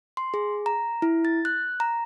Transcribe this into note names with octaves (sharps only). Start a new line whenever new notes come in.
C6
G#4
A#5
E4
A6
F#6
A#5